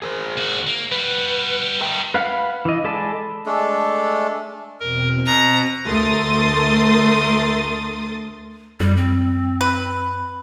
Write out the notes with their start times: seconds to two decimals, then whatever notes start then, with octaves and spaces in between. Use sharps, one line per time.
0.02 G#4 A#4 C5
0.37 D#2 F#4
0.67 A#3
0.92 G3 F#4 B4
1.81 A#4 E5 G5
2.14 B4 F5 F#5 B5
2.65 E3 D#5
2.84 G#3 A4 D5 A5 B5
3.46 G#3 A3 D4 A4
4.80 E2 B2 C4 A#4
5.26 B2 C4 A#5
5.88 D2 A3 A#4 C6 D#6 A6
8.80 F#2 G3
8.97 C4
9.61 B4